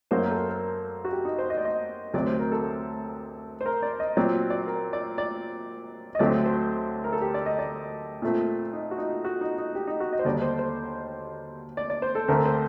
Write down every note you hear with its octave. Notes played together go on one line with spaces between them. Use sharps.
F#2 F#3 A#3 C5
A#4
A4
A#4
A#4
F#4
G4
D#4
C5
D#5
D5
D#5
D2 C3 F#3 D5
C5
A#4
A4
C5
A#4
D5
D#5
A#2 F#3 C4 D5
D5
A#4
D5
D5
D#5
D2 D3 F#3 A3 C4 D5
C5
A#4
A4
G4
D5
D#5
D5
A#2 A3 C4
D#4
F#4
D#4
F#4
D#4
D#4
G4
D#4
F#4
D#5
C5
D#2 D3 G3 D5
C5
C5
D5
D5
C5
A4
D2 D3 A3 C4 A#4
C5